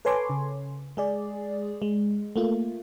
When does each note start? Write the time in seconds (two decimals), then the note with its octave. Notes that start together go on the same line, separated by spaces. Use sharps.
0.05 A4 B4 C#5 G#5 C6 D6
0.29 C#3
0.97 G#3 G#4 D5
1.82 G#3
2.36 A3 A#3 F4